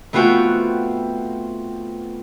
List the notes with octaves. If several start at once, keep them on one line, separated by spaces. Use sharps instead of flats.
A3 B3 C4 F4 F#4 G5